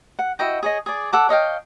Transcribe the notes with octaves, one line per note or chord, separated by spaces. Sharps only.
F#5
E4 F#4 D#5 G5
G#4 C#5 D#5
G#4 D5
A4 F#5 D6
C#5 D#5 F5 G5